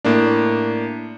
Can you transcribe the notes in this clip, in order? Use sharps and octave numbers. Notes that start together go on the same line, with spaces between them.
A2 A#3 D4